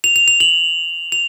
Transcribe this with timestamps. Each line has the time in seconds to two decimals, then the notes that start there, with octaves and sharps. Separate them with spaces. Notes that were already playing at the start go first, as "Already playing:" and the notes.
0.04 F7
0.16 F7
0.28 F7
0.40 F#7
1.12 F7